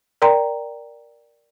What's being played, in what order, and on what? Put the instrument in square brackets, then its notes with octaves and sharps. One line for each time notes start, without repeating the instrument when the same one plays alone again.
[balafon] A#4 D5 G5 A#5 C6